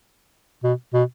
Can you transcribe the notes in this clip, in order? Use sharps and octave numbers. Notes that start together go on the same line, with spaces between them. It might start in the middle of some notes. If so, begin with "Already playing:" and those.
B2
B2